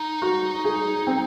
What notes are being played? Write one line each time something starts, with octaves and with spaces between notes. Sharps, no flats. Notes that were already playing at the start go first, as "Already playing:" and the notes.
Already playing: D#4
F#4
G#4
C4